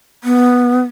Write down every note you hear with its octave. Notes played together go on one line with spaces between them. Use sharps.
B3